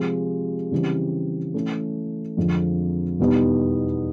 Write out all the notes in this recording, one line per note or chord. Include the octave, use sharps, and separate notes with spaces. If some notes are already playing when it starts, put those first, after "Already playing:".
Already playing: C3 F3 G#3
C#3 E3 G3 C4
E3 A3 C#4
F2 D3 F3 G#3 C4
E2 B2 G3 B3 D#4